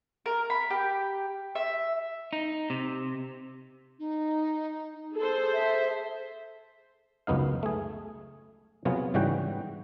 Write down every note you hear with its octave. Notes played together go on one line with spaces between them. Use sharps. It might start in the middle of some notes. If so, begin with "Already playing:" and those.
A#4
B5
G4
E5
D#4
C3
D#4
G#4 A4 C5
E5
C#2 F#2 B3 D#4 F5
A3 G#4
C3 F#3 B3 F4 G#4
G#2 C#3 E3 G3 F#4 G5